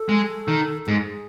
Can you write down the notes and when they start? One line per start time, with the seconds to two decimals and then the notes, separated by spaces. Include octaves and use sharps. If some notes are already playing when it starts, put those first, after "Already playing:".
Already playing: A4
0.09 G#3
0.48 D#3
0.87 G#2 G#4